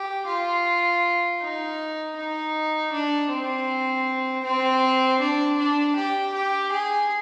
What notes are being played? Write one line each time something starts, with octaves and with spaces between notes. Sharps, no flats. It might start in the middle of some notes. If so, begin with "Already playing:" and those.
Already playing: G4
F4
D#4
D#4
D4
C4
C4
D4
D4
G4
G4
G#4